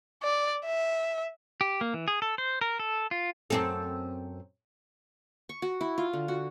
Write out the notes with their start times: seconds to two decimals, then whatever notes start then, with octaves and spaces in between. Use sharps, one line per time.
0.23 D5
0.66 E5
1.61 G4
1.81 A#3
1.94 E3
2.08 G#4
2.22 A4
2.38 C5
2.61 A#4
2.79 A4
3.11 F4
3.50 F#2 C4 A4
5.49 C#6
5.62 F#4
5.81 E4
5.98 F4
6.13 D3
6.28 F#4